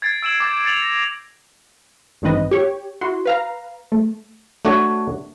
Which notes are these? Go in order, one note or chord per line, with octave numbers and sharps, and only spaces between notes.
G#6 A6 C7 D7
E6 D7 E7 F#7
D6 G6 A6
A6 C#7 F7 F#7
A#6
A1 G2 D#3 C4 B4 D#5
G4 C#5
E4 F#4 C6
B4 F5 A#5
A3
A3 D4 F#4 C#5